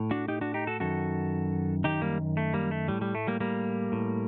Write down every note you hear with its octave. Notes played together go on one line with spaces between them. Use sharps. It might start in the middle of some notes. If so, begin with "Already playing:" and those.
Already playing: A2
D4 F#4
D#4 G4
D4 F#4
D#4 G4
F#4 A4
F#2 D#3 F#4 A4
F#2 D#3 D#4 G4
G3 A#3
A3
G3 A#3
A3
A2 G3
G3
A3
G3 A#3
G3 A#3
A2